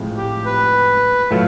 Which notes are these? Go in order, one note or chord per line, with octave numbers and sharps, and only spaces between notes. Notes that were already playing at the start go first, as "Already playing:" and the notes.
Already playing: A2 F3 G#3 C4 E4
G4
B4
A2 F#3 A3 F4